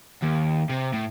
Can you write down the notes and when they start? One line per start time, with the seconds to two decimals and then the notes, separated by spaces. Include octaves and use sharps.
0.22 D#2
0.69 C3
0.94 A2